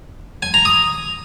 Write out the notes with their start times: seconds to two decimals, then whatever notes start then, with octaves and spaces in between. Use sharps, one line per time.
0.42 G#5
0.54 A#5
0.65 D#6